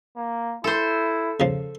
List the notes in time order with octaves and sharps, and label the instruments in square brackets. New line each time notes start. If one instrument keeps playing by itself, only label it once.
[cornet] A#3
[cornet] E4 [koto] A4 C5
[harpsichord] C#3 F3